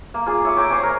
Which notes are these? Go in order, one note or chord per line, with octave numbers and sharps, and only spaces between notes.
A#3
F4 G#4 D5
C#5 E5 G#5 D6
C#5 G5 A#5 D6
C5 C#5 G#5 A#5
A#4